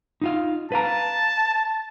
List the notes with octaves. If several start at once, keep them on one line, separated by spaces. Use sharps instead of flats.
D#4 F4 F5
B4 F5 A5 A#5